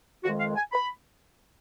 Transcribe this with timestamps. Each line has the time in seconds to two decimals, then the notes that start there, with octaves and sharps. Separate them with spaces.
0.23 F2 D#3 G#3 F#4
0.40 F5
0.56 G#5
0.72 B5